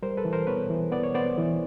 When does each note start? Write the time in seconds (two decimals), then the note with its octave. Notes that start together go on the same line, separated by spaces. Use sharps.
0.02 G3 A#4 C5
0.17 A4 B4
0.25 E3
0.33 A#4 C5
0.47 B3 B4 C#5
0.70 E3
0.92 B3 D5
1.04 C#5
1.14 B3 C5 D5
1.38 E3